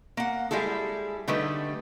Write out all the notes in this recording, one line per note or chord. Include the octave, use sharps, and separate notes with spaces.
A#3 F#5
G3 G#3 E4 G#4 A4
D3 G3 A3 D#4 B4